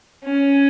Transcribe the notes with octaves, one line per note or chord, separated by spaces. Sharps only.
C#4